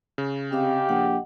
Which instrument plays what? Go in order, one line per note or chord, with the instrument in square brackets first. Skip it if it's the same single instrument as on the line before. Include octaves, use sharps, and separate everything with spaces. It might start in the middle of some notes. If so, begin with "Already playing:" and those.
[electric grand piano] C#3
[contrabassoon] C3 [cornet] G4 [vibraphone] D#5 F5 D6
[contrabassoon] A#1 [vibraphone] D#5 F#5